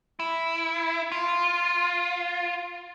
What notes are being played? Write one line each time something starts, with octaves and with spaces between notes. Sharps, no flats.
E4
F4